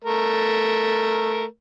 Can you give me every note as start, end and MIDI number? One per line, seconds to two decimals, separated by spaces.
0.04 1.45 57
0.04 1.45 70